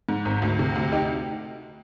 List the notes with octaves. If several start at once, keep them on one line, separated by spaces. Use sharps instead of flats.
G#2
G#1
D2
C3
D2
D#4 G4